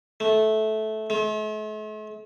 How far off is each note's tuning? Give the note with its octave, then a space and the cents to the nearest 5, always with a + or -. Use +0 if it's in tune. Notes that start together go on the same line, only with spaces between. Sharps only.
A3 -15
A3 -45